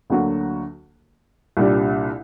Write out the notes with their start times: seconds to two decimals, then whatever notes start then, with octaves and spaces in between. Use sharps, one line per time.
0.10 D2 D3 F#3 A#3 F#4
1.57 C2 A#2 G3 D4 G4